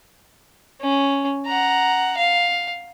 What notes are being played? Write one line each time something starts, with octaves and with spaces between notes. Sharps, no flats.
C#4
F#5 A#5
F5